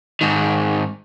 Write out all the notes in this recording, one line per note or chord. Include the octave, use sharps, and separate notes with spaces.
G#2 D#3